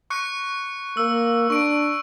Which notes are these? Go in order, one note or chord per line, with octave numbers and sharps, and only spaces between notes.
C#6 F#6 C#7
A#3 E6
D4 C#6 D7